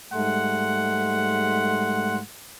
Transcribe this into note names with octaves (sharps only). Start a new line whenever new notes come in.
G#2 G3 A3 F#5 C6